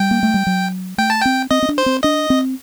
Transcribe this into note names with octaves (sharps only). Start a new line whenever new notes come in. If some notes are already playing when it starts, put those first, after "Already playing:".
Already playing: G3 G5
A#3
A3
G3
F#3
A3 G5
A5
C4 G5
C4 D#5
C4
D4
C5
C4
D4 D#5
C4